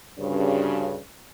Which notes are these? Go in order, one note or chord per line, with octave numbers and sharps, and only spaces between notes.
D2 G2 C#3